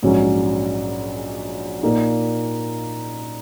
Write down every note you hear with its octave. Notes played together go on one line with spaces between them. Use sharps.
A#1 G#2 F#3 C#4
A#2 A#3 D#4